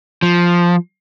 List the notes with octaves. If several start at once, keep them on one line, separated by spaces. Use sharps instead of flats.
F3